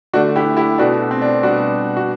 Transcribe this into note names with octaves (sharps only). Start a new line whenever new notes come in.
D3 A3 D4 F#4
E4 G4
E4 G4
B2 A3 D4 F#4
C4
D4
B2 G3 D4 F#4
F#4